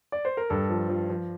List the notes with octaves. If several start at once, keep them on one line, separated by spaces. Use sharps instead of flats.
D5
C5
A#4
G2 A4
F3
F3
F3